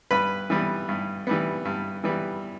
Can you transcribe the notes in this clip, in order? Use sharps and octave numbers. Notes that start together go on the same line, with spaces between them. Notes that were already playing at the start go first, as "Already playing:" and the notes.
G2 B4 B5
E3 G3 B3
G2
E3 G3 B3
G2
E3 G3 B3